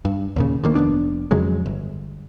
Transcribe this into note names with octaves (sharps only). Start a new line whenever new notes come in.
G2
D#2 A#2 C#3
D2 D#3 A#3
F1 A2 B3 D4
F2 C#3 F#3 G#3
G1